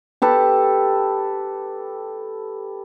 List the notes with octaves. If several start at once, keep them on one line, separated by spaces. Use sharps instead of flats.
G4 A4 B4